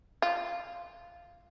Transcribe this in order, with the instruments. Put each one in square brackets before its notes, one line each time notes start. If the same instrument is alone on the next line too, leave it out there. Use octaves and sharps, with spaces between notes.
[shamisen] F4